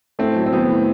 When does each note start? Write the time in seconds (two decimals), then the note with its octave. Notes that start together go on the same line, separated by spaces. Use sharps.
0.19 A2 A3 C4
0.36 F#3
0.46 C4
0.52 F#3 B3
0.69 A2